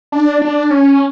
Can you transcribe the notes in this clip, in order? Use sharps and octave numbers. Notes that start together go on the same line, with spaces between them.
D4
D4
C#4